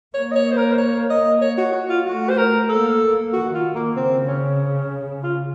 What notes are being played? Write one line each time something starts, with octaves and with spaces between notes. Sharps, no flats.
A#3 C#5
D#5
C#5
C5
A#4
C5
C#5
D#5
C#5
F#4
F#4
F4
A3 F#4
C5
A#4
A#3 A4
D#3 F#4
F4
A#3
C#3 C4
C#4
F4